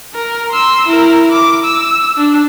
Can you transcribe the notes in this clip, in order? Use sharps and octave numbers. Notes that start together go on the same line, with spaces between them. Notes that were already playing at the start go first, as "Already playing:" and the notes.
A#4
C6 E6
E4 A#4
D6
E6
D4